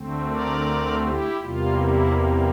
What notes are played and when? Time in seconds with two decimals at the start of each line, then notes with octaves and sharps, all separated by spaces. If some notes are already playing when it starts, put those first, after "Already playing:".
Already playing: D2 D3 A3 C4
0.27 A#4 D5
1.03 E4 G4
1.41 E2 C3 G3 A#3 F4
1.79 E4